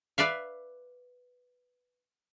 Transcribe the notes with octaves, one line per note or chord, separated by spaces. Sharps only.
B4 D5 E5 F5